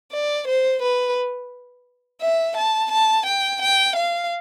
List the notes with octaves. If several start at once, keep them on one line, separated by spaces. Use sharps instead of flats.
D5
C5
B4
E5
A5
A5
G5
G5
F5